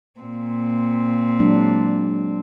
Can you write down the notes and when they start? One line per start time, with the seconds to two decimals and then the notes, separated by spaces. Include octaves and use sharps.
0.20 A#2 C4
1.40 F#3 G#3 D4